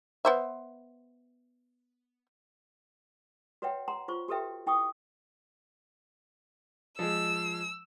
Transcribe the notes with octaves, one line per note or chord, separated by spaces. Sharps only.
B3 C5 E5
F#4 B4 C#5 E5 F#5 G5
F#5 A#5 C6
F4 C5 C#6
F#4 G4 A4 B4 E5 G5
E4 G5 C#6 D#6
F3 G#3 E6